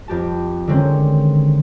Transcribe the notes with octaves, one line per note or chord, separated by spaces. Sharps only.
F2 G4 A5
D3 D#3 G#3 C4 C#4